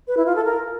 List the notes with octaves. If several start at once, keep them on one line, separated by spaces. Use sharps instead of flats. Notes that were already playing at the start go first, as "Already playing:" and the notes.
B4
E4
F4
A4
A#4